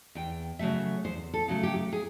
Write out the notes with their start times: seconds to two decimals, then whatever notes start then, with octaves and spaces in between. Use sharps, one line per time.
0.15 E2 G5
0.59 C#3 F#3 A3 E5
1.04 E2 C5
1.34 A4
1.48 C#3 F#3 A3
1.63 G4
1.92 G#4